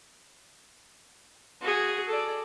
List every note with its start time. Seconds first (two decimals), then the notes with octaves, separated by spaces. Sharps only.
1.61 F#4 G#4
2.09 A4 D5